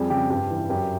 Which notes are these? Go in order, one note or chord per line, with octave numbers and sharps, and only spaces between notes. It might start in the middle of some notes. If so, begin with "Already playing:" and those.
Already playing: F2 G3 G#4
C#3 G4
G2 G4
E3
F#2 G4